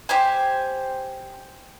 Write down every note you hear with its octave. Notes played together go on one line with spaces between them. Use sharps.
G4 C5 G#5